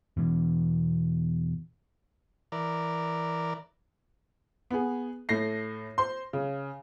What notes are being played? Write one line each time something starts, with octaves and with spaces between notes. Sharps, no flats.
E2 B2 E3
E3 A#4 D5
B3 G#4
A2 A3 A#6 C7
C5 C6
C#3